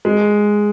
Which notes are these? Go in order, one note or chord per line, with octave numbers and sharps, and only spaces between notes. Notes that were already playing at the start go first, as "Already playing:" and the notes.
G#3